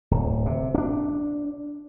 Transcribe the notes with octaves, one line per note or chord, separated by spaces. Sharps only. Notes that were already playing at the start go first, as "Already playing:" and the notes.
D1
C3
C#4 D4